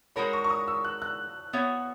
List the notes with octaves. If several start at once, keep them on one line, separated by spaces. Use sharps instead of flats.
G#3 D#4 F#4 A#4 C#5 B5
C#6
C#6
D#6
E6
F#6
F#6
B3 F#4 C#5 E5